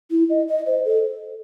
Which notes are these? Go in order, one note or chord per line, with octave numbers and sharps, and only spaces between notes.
E4
D#5
D#5
C5
A4